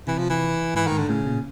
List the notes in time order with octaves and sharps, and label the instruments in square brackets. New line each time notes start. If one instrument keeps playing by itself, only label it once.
[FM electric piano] C3 [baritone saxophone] E3
[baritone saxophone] F3
E3
[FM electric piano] G#2 [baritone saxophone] E3
[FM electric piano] G#2 [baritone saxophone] D#3
[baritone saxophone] D3
[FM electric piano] A2 [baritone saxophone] C#3
[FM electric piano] A#2